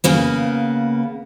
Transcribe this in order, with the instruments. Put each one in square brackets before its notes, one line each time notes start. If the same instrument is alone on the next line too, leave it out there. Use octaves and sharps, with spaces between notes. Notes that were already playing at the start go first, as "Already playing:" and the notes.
[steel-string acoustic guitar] C#3 A#3 B3